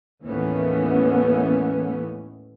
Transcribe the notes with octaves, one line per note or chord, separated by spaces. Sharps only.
D#2 A2 E3 A3 B3 C#4